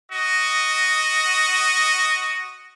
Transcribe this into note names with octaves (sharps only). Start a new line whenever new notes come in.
F#4 D#5